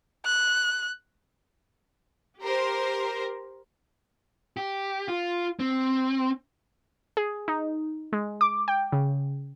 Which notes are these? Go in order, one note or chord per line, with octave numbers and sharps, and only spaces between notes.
F#6
G4 A#4 C5
G4
F4
C4
G#4
D#4
G#3
D6
G5
C#3